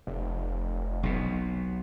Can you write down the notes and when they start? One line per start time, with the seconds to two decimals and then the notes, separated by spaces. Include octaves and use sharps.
0.07 F1
1.03 B1 B2